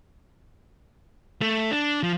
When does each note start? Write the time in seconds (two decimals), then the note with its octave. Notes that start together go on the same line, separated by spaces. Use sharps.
1.41 A3
1.71 D4
2.03 F3